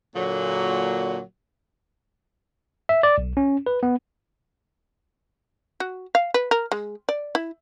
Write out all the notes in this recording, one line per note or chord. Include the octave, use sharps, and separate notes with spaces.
A#2 D3 F#3
E5
D5
B1
C#4
B4
B3
F#4
F5
B4
A#4
G#3
D5
E4